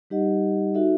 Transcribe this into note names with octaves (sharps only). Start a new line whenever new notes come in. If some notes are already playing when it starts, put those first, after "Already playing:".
G3 D#4 G4 D#5 F#5
D#4 F#4 A4 E5